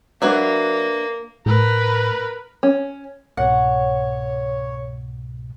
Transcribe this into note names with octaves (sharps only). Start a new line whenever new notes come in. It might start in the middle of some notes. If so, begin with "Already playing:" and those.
F#3 A#3 D4 F#4 B4 C#5 E5
A2 A#4 B4
C#4
C2 G#2 B2 C#5 F#5